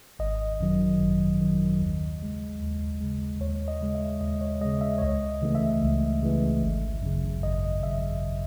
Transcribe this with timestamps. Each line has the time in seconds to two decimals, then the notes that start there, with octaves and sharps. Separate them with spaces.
0.19 G#1 D#5
0.60 F#2 D#3 F#3
1.00 G#1
1.40 F#2 D#3 F#3
1.81 D#2
2.21 C#3 G#3
2.61 D#2
3.00 C#3 G#3
3.41 D#2 C#5
3.68 D#5
3.81 C#3 G#3
3.95 E5
4.21 D#2 D#5
4.41 C#5
4.61 C#3 G#3 D#5
4.81 E5
4.98 C#5
5.02 C#2 D#5
5.42 C#3 E3 A3
5.55 E5
5.82 C#2
6.23 C#3 E3 A3
6.62 G#1
7.02 F#2 C#3
7.42 G#1 D#5
7.83 F#2 C#3 E5